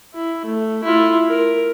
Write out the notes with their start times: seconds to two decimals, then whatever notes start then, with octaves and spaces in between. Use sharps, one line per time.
0.14 E4
0.45 A3
0.83 E4 F4
1.28 A#4